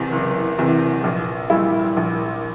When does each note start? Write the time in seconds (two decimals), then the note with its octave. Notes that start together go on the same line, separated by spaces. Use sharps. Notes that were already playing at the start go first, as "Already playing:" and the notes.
Already playing: F#1 E2 C3
0.12 F#1
0.59 E2 C3
1.04 A#1
1.50 A#2 G3 E4
1.97 A#1